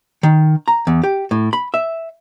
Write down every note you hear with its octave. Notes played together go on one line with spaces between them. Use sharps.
D#3
A#5
E2
G4
A2
B5
E5